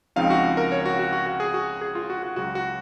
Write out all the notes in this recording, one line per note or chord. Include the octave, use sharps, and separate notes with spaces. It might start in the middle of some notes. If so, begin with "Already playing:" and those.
C#2 C#3 F3 C4 D#4 F5
F#4
A#4
C#5
F#4
F#4
F#4
F#4
G#4
F#4
G#4
F4
F#4
F#4
C#2 C#3 F#3 F#4
F#4